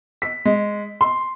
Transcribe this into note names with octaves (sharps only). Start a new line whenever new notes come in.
B6
G#3
C6